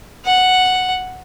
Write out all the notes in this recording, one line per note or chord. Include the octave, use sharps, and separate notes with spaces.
F#5